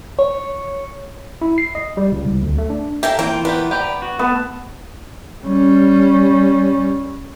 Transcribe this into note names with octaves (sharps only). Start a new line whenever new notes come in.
C#5
E4
C7
D#5
G3
C#2
C2
D2
A3
D4
E4 G4 A4 A#4 F5 G#5
E3 A#3 C4 F4 A#4 G5
B3 G4 A#4 B4
G4 B4 D5 G5 A#5
F#4
A3 B3 A4 A5
G3 C#4